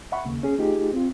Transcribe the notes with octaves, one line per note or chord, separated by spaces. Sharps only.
E5 F#5 B5 C#6
D#2 C#3 A#3
C#4 G#4
A3 D#4 F4 G4 G#4
C4 F4